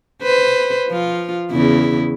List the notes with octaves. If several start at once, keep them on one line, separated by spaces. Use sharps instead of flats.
B4 C5
F3 F4
E2 C#3 E4